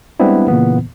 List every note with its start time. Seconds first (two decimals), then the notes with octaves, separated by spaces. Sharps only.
0.20 G3 G#3 B3 C4 D4 E4
0.48 A#2 C#3 E3 A#3 B3